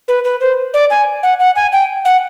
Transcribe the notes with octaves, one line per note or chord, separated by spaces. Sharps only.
B4
B4
C5
D5
G#5
F#5
F#5
G#5
G5
F#5